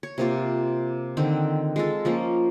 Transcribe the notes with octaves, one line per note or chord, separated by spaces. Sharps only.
C#5
C3 A#3 F4
D3 D#3 C4
G#3 F4 A4
F3 A#3 C#4